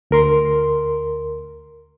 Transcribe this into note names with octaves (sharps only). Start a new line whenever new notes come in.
D2 A#4 C6